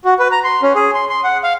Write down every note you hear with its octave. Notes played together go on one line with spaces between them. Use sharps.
F#4
B4
A#5
C6
C#4
G#4
C6
C6
F#5
F5